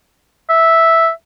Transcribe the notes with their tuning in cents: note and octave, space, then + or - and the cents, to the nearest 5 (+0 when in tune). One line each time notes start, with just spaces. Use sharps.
E5 -5